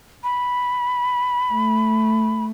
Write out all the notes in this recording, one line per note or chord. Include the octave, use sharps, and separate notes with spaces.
B5
A3